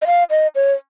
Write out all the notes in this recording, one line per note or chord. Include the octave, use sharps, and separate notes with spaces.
D#5
F5
D#5
C#5